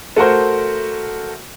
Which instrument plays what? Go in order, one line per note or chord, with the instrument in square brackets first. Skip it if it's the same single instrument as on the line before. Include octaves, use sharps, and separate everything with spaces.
[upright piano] A3 F#4 A#4 C5